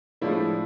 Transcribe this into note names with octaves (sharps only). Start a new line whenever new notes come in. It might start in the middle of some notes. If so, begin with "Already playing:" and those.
A2 F3 G#3 D4 E4